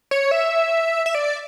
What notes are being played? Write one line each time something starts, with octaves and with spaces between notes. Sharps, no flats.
C#5
E5
E5
D5